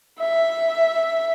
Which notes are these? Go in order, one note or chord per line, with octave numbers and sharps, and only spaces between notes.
E5